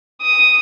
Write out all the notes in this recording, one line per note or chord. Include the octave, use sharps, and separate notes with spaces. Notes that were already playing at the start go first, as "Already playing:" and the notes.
D#6